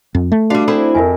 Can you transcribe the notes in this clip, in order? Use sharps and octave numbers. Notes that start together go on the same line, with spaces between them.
F2
A3
G3 D4 F#4 F5 D6
C4 E4 G#4 A4
F2 A#4 E5 G#5